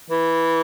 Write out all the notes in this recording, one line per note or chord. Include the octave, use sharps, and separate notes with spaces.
E3